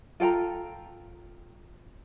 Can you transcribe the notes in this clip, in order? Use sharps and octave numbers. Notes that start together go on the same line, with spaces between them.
F4 A4 G5 A#5